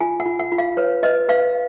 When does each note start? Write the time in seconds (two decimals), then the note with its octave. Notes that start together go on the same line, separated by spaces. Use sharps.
0.01 F4 G#5
0.20 F#5
0.26 F4
0.39 F#5
0.52 F4
0.58 F5
0.77 B4 C#5
1.03 B4 D#5
1.29 B4 F5